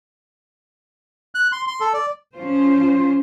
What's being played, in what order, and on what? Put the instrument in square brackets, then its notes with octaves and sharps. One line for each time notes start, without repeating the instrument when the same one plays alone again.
[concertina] F#6
C6
C6
A4
D5
[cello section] F3 C#4 F4 C5